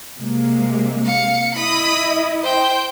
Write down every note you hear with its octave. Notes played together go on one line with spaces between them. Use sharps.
C3 G#3 A#3
F5 C#7
E4 D#5 B5 D#6
C5 G5